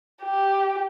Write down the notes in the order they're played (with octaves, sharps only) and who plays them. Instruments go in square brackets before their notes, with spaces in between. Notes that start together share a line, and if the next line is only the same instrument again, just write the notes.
[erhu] G4